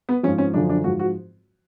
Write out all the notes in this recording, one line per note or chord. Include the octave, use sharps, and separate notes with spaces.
B3
G#2 F3 C#4
C#4
F#2 D3 F3 D4
D4
G#2 F3 F#4
F#4